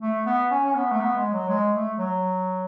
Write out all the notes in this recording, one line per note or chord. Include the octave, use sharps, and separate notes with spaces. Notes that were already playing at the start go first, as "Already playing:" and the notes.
A3
B3
C#4
C#4
B3
A3
B3
G#3
F#3
G#3
A3
F#3